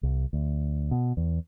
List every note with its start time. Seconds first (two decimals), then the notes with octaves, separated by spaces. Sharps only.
0.03 C2
0.33 D2
0.91 B2
1.17 E2